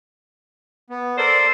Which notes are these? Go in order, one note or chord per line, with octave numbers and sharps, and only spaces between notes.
B3
A4 A#4 C5 D5